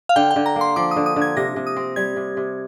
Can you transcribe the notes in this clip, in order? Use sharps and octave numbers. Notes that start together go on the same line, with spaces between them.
F5
D3 G5
G5
D3
A#5
A#3
C6
F3 D6
D#6
D3
D#6
D3
G#6
C3 A#6
C3
D#6
C4
G3 G#6
C3
C3